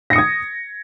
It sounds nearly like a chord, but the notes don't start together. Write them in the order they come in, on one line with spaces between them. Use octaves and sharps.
A#6 C#7 D#6 G#6